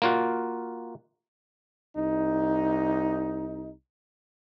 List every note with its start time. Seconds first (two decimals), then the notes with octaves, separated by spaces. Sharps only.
0.02 A#3 F4 F#4
1.97 C2 D#4